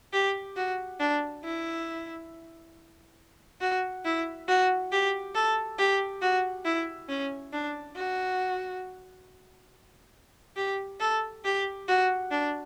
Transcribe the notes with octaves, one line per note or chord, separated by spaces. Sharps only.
G4
F#4
D4
E4
F#4
E4
F#4
G4
A4
G4
F#4
E4
C#4
D4
F#4
G4
A4
G4
F#4
D4